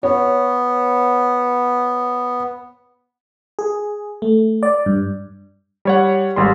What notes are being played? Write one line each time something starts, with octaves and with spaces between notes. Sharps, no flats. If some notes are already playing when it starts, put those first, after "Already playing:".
B3 C#5
G#4
A3
D5
G2
G3 C#5 F#5
G#1 G3 C6